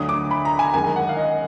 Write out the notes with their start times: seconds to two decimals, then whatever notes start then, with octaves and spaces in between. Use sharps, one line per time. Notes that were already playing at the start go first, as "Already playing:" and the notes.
Already playing: D2 D3 F#3 D#6
0.09 D6
0.31 B5
0.45 A#5
0.59 G#5
0.74 F#2 D#3 G#3 G#5
0.96 F#5
1.09 F5
1.17 D#5